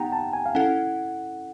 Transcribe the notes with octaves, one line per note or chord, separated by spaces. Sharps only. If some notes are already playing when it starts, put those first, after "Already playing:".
Already playing: B3 D#4 G4 F#5 G5 A#5
A5
G#5
F5
C#4 E4 A4 F#5